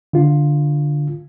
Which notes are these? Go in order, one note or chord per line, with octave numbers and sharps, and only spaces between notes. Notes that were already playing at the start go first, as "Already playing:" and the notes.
D3 F4